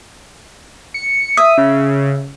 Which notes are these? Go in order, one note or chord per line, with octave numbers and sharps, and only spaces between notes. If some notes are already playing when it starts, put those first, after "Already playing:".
C#7
E5 D#6
C#3